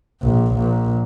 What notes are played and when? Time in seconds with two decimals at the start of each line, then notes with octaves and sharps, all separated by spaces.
0.22 A#1
0.54 A#1